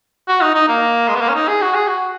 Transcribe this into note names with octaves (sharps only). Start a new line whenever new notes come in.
F#4
D#4
D#4
A#3
G#3
B3
A#3
C#4
D#4
G#4
F#4
G#4
F#4